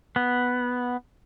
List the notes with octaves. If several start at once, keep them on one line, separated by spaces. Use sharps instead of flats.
B3